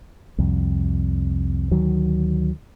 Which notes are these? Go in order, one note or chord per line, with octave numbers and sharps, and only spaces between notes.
C2 F2
D2 D#3 F#3